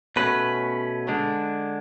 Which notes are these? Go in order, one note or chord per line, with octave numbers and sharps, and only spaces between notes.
B2 A3 C#4 B4
D3 G#3 D4